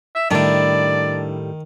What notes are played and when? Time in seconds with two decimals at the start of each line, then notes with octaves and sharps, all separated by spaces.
0.15 E5
0.31 A2 D#3 G3 D4 E4 D5